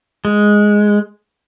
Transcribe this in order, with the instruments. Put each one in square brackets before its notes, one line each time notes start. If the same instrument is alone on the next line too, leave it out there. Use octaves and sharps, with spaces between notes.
[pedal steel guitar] G#3